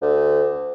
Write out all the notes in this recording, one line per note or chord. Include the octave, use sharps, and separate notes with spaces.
D2